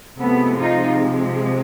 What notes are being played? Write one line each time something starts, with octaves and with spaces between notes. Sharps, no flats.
C3 F3 G#3 A3 B3
D#4 F4